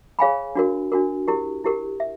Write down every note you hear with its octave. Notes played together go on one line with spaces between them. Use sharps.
G#4 C#5 F5 G#5 B5
D4 F#4 A#4
D4 F#4 A#4
E4 G4 A#4
E4 G4 A#4
E5